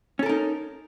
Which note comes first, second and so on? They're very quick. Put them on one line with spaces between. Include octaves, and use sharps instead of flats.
C#4 A4 A#4 D#4